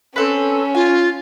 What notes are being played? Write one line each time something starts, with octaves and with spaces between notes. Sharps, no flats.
C4 C#4 A4 B4
F4 G#5